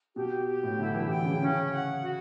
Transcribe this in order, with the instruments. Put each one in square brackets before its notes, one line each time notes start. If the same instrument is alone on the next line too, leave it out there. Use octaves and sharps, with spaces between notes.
[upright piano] B2 [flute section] G4
[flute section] G4
[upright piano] A2
[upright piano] D3 [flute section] E4
[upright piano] E3
[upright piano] D3 [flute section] G5
[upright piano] C#3
[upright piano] C#3 [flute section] C#4
[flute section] F#5
F#4